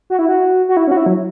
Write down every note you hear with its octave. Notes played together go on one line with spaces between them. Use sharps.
F#4
E4
F#4
F#4
E4
C#4
F#4
E4
F#3